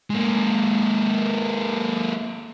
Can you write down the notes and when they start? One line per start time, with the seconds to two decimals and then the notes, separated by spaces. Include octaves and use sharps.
0.10 G#3 A#3